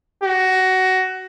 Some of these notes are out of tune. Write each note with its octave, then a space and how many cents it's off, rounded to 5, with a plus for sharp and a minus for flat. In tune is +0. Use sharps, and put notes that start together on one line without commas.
F#4 +15